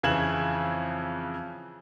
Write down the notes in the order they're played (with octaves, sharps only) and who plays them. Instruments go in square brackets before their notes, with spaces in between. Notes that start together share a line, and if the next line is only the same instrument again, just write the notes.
[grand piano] F2 C#3 E3 G#6 E7 F#7